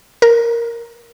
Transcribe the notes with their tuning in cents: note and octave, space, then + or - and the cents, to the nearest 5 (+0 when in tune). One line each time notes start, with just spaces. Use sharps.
A#4 +0